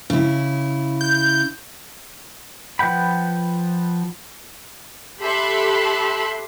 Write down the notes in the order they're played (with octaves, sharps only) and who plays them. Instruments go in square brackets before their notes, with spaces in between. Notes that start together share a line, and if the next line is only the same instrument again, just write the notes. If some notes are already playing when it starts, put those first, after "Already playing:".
[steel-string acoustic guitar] C#3 E4
[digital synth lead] G6
[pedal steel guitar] F3 B4 F#5 G5 B5
[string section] G4 A4 E5 B5 C6 F#6